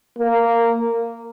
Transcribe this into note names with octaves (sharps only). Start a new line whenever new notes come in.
A#3